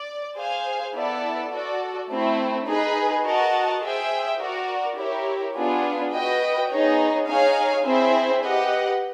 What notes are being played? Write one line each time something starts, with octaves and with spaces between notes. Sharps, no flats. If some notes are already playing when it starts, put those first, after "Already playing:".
Already playing: D5
G#4 C5 F5 G#5
B3 E4 A4 D5
F#4 A4 D5
A3 C4 E4
D#4 G#4 B4
F#4 A#4 D#5 F#5 A5
G#4 C5 E5 G5
F#4 A#4 D5
E4 G4 A#4 C#5
B3 D4 F4 G#4
F#4 B4 D#5 G5
B3 D#4 G#4 C#5
D#4 G#4 C#5 F5 G#5
C4 E4 G#4 C5 E5
G4 B4 D#5 F#5